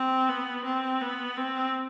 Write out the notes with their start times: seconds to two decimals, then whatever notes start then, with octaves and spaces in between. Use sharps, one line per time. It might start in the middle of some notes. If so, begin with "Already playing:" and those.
Already playing: C4
0.29 B3
0.65 C4
1.01 B3
1.37 C4